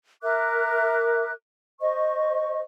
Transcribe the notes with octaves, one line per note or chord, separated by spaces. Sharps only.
A#4 E5 D6 F#6
C5 D#5 C#6